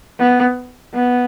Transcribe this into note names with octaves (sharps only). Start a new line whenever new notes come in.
B3
B3